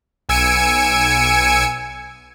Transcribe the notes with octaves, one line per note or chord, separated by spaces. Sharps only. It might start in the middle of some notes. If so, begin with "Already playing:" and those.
B1 G#5 E6 G#6 C#7 D7